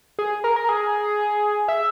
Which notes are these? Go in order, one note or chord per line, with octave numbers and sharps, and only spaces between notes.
G#4
A#4
A#4
G#4
E5